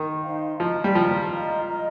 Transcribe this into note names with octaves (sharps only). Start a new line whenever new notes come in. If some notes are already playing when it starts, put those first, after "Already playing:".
Already playing: D#3
D#4 C5 F5 C6
F3 F4 D#5 A#5
G3
F3 F4 D#5 A#5
F4 D#5 A#5
F4 D#5 A#5